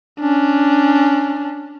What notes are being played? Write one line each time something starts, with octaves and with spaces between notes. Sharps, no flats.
C#4 D4